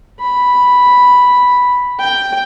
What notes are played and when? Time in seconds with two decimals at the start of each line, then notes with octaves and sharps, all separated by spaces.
0.20 B5
2.00 G5